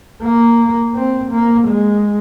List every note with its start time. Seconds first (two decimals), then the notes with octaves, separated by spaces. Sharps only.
0.22 A#3
0.95 C4
1.31 A#3
1.68 G#3